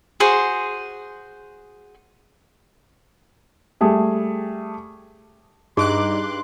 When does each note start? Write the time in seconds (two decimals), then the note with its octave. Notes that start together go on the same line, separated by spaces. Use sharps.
0.20 F#4 G#4 C5
3.81 G3 A3 G#4
5.77 G2 D#4 G#4 C6 D6 F#6